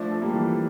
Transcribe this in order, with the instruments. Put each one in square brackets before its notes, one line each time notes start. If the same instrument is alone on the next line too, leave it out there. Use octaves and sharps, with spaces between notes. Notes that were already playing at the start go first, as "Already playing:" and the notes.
Already playing: [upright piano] F3 A3 [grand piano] D4
[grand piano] A4
[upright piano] G3 A#3
[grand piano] E3